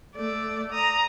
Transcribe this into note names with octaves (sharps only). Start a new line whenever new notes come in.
A3 D5
A#5 D#6